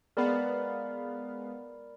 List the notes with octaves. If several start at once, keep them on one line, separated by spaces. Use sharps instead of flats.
G#3 B3 A#4 D5 F5 B5